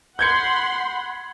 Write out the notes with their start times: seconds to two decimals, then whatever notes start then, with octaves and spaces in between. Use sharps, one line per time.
0.19 F#5 B5 C6 G6 G#6 C#7